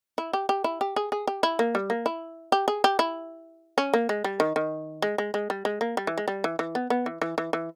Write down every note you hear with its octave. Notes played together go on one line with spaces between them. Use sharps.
E4
G4
G4
E4
G4
G#4
G#4
G4
E4
A#3
G3
A#3
E4
G4
G#4
G4
E4
C#4
A#3
G#3
G3
D#3
D#3
G#3
G#3
G#3
G3
G#3
A#3
G3
E3
G#3
G3
E3
E3
B3
B3
E3
E3
E3
E3